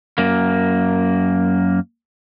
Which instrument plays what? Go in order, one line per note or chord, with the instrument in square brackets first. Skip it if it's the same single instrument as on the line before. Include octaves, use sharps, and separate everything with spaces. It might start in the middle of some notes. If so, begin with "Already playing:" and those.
[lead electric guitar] F#2 A#3